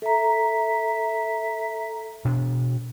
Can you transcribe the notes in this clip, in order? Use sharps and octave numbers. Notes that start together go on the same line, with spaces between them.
A4 E5 A#5
B2 D4